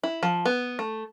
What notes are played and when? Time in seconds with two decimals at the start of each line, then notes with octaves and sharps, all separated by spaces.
0.03 E4
0.23 F3
0.45 B3
0.79 A3